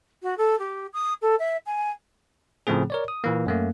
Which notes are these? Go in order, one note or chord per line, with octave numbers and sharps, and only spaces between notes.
F#4
A4
G4
D#6
A4
E5
G#5
A2 C#3 F3 A3 C4 G#4
A#4 C#5 D5
D#6
A#2 E3 A#3
F#2 A3 A#3